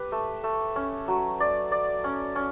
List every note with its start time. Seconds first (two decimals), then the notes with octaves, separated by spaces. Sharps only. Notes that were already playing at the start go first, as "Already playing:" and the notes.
Already playing: G4 B4
0.12 A3
0.44 A3
0.76 C#4
1.08 F#3
1.40 D5
1.72 D5
2.04 C#4
2.35 C#4